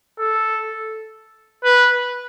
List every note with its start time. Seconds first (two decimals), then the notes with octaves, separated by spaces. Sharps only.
0.18 A4
1.64 B4